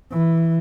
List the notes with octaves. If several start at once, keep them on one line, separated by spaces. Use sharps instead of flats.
E3